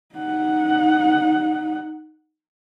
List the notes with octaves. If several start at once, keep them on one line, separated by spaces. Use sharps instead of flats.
D#4 F#5